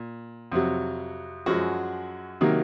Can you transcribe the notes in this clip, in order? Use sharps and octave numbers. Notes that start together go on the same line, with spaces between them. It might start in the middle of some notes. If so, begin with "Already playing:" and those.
Already playing: A#2
F2 C3 F#3
F#2 F3 F#3 G#3 F#4
C3 D#3 F#3 A#3